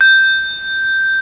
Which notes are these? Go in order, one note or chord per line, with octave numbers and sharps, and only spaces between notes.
G6